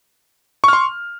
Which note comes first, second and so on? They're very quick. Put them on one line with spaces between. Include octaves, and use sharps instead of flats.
C#6 F6 C6